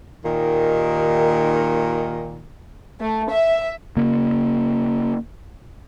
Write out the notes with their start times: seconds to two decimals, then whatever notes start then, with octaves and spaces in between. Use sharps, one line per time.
0.24 D#2 A#2 D#3
3.00 A3
3.30 E5
3.97 C#3 A#3